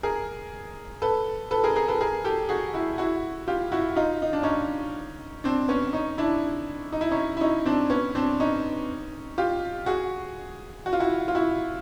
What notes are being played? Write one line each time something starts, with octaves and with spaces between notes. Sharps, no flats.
G#4 A#4
A4 B4
A4 B4
G#4 A#4
G#4 A#4
A4 B4
G#4 A#4
G4 A4
F#4 G#4
E4 F#4
E4 F#4
F4 G4
E4 F#4
D#4 F4
D#4
D4
C#4 D#4
C4 D4
B3 C#4
C#4 D#4
D4 E4
D#4
E4
C#4 D#4
E4
C#4 D#4
C4 D4
B3 C#4
C4 D4
C#4 D#4
F4 G4
F#4 G#4
F#4
F4
E4 F#4
F4
E4 F#4